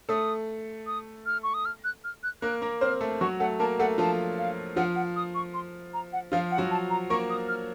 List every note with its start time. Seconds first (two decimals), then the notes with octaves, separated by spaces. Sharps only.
0.09 A3 A4 D#6
0.87 D#6
1.26 F6
1.43 C#6
1.54 D#6
1.65 F6
1.84 F#6
2.04 F6
2.23 F#6
2.42 A#3 A#4 F#6
2.62 A#3 A#4
2.81 C4 C5 F6
3.01 A3 A4
3.21 F#3 F#4 C#6
3.40 A3 A4 F#5
3.59 A#3 A#4 A5
3.79 A3 A4 F#5
3.98 F3 F4 A5
4.38 F5
4.76 F3 F4 F#5
4.96 F#5
5.16 D#6
5.35 C#6
5.54 C6
5.94 A#5
6.13 F#5
6.32 F3 F4 F5
6.51 F#5
6.58 F#3 F#4
6.71 A5
6.90 A#5
7.10 A#3 A#4 C#6
7.30 D#6
7.49 F6